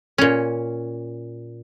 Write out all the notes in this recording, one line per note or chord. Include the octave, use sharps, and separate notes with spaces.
A#2 C#4